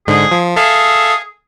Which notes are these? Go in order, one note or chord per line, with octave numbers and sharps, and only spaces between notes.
G#2 D3 G#4
F3
G#4 A4 E5 F5